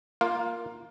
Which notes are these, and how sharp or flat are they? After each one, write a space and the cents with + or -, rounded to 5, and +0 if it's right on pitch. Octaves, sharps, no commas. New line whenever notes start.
A#3 +0 F4 +0 F5 +20